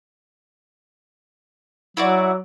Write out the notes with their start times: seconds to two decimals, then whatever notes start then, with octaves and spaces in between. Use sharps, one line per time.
1.97 F#3 E4 F#4 D5